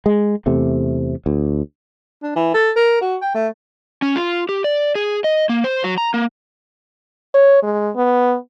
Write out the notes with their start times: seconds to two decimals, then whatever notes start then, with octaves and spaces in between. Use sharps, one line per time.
0.06 G#3
0.46 E2 C3 A3
1.26 D2
2.23 D4
2.36 E3
2.54 A4
2.76 A#4
3.01 F#4
3.22 G5
3.35 A3
4.02 C#4
4.16 F4
4.49 G4
4.64 D5
4.95 G#4
5.24 D#5
5.49 A#3
5.64 C5
5.84 F#3
5.98 A#5
6.14 A#3
7.34 C#5
7.63 G#3
7.95 B3